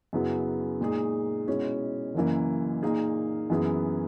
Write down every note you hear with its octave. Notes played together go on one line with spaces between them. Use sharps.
F#2 C#3 F#3 B3 E4
A#2 G#3 D#4 G#4
B2 G#3 C#4 E4
F#1 F#2 E3 A#3
A#2 A#3 D#4 G#4
F#2 E3 B3 E4 G#4